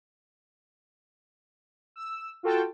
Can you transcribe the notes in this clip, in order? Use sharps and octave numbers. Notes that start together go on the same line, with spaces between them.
E6
F4 F#4 A4 G5 A5